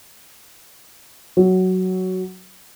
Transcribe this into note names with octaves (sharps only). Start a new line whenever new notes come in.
F#3